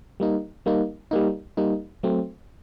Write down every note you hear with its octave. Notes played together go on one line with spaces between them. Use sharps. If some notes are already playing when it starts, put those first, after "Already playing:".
G3 A#3 D#4
G3 A#3 D#4
G3 A#3 D#4
G3 A#3 D#4
F#3 A3 C4